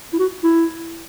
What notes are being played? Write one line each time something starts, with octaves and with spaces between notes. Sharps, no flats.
E4
F#4
E4